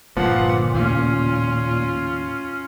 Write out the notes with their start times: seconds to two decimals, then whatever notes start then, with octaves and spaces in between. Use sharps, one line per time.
0.17 G1 A#2 D3 F3 A#3 B4 F#5
0.74 D#2 A2 C#3 C#4 F4